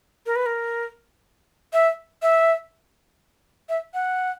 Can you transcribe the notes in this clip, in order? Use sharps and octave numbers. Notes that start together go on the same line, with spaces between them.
A#4
B4
A#4
E5
E5
E5
F#5